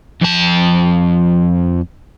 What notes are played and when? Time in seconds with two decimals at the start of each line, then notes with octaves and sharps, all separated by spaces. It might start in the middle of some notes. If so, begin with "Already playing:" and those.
0.21 F2 A5